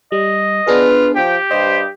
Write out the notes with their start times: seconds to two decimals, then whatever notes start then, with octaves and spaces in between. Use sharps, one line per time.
0.12 G3 D#5
0.67 B3 D4 F4 G#4 B4
1.15 F3 G4 G5
1.51 G2 C5 D#5